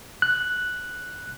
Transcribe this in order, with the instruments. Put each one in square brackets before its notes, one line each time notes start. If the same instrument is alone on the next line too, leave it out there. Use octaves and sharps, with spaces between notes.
[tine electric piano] F#6